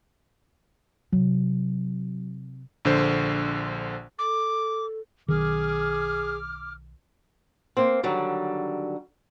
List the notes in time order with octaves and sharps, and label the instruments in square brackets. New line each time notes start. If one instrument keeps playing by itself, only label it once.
[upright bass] C3 [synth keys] F#3
[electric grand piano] A#1 D3 C5
[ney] A4 [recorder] D6
[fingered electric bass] B1 D#3 [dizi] G#4 [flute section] D6 F6
[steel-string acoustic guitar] A#3 C4
D3 D#3 F#3 G3